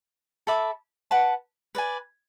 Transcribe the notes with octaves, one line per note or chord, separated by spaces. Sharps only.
A4 E5 B5 D6
B4 F#5 A5
B4 D5 G#5